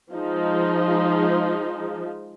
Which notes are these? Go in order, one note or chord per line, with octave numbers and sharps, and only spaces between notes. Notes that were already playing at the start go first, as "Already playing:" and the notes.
F3 G#3 D#4